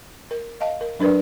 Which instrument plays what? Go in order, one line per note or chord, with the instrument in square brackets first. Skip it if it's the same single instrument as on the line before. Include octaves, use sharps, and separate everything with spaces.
[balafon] A#4
D#5 F5 A5
A#4
F#3 D4 A#4 B4 D5